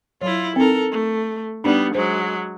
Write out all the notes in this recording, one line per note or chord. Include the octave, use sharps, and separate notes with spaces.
F#3 E4 F4 C#5
C4 D#4 A4 A#4
A3
G3 B3 D4 D#4 D5
F#3 G#3 C5